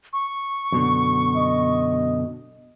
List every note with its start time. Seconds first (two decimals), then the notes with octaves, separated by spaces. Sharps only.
0.13 C#6
0.72 F#2 B2 D3
1.36 D#5